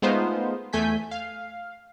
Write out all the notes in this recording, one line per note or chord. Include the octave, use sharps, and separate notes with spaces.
G#3 A3 B3 D#4 F4 C5
E2 A3 G#5 G6 B6
F5